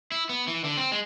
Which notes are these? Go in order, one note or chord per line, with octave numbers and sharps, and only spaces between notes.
E4
B3
E3
D3
C4
G#3